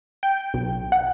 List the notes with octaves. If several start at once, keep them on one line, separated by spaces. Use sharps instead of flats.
G5
B1
F#5